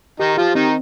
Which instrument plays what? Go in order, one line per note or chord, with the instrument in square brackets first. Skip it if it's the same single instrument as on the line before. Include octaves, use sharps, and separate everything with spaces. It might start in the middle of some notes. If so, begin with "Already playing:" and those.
[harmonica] D#3 D#4 [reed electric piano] G4
[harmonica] F3 F4 [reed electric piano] G4
[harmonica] D#3 D#4 [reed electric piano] C4